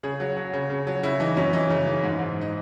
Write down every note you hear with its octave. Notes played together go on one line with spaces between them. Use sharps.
C#3 G#4
F#3
F#3
C#3
C#3
F#3
C#3 E4
E3 D#4
F#2 C#4
E3 D#4
C#3
E3
G#2
G#2
D#4